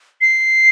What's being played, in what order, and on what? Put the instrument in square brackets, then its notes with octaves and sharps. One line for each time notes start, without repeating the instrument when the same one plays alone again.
[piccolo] C7